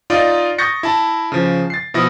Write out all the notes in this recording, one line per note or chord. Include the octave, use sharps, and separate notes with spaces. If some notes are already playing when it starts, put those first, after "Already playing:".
D#4 F4 D5 D#5
C#6 D#6 G6 A6 A#6 C#7
E4 A5
C#3 F3
A6 C7
B2 F3 E4 D#6 A#6